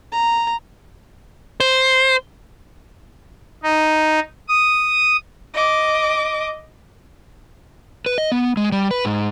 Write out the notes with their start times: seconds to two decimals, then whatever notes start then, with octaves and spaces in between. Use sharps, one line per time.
0.12 A#5
1.60 C5
3.63 D#4
4.48 D#6
5.54 D#5 D6
8.06 B4
8.18 D#5
8.32 B3
8.57 G#3
8.72 G3
8.91 B4
9.05 G#2